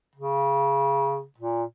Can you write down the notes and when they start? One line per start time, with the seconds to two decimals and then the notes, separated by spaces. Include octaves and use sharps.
0.16 C#3
1.38 A#2